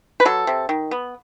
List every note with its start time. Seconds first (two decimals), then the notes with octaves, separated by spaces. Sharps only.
0.20 B4
0.25 F#3 A4
0.47 C3
0.69 D#3
0.91 B3